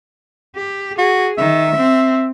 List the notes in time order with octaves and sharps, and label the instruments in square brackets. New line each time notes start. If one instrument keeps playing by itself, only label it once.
[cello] G4
[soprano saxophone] F#4 [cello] G#4
[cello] D#3 [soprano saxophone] E5
[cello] C4